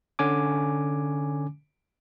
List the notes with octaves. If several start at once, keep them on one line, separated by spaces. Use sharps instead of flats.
D3 C#4 G#5 D6